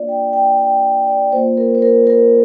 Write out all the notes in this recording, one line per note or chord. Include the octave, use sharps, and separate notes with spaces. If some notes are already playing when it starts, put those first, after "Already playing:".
Already playing: A#3 D4 F4 D5
G5
G5
G5
D5
A#3 F4 C5
A#4
C5
A#4
A#4